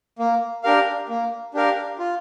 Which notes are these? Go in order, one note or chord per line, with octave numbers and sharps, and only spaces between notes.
A#3
D4 G4 A#4 F5
A#3
D4 G4 A#4 F5
F4